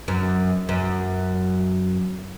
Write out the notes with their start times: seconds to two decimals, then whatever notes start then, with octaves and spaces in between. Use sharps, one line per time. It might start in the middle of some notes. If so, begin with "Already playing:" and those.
0.08 F#2
0.69 F#2